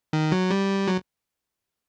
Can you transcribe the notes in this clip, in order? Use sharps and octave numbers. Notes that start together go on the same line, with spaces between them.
D#3
F#3
G3
F#3